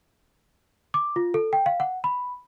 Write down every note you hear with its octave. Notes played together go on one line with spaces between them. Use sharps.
D6
F4
A4
G5
F5
F#5
B5